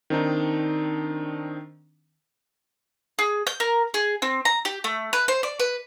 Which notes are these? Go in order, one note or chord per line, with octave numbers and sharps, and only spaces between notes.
D#3 C4 D4 D#4
G#4
G6
A#4
G#4
C4
A#5
G4
A3
B4
C5
D5
B4